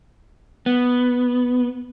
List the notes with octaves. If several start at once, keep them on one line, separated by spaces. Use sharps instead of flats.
B3